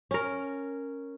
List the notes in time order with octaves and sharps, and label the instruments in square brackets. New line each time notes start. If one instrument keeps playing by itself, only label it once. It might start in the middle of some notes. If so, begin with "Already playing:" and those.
[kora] C#4 A#4